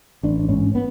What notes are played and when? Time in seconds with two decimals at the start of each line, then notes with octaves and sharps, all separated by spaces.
0.23 A1 D4
0.49 G#2 C#4
0.75 B3